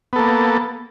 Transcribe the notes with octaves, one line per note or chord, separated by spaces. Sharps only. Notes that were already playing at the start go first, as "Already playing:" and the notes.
A#3 B3 A4